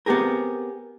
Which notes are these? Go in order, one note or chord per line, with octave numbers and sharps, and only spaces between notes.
B3 C4 G4 G#4 A#4